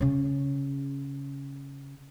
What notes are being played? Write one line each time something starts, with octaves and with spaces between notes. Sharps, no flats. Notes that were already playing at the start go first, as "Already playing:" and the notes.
C#3 C#4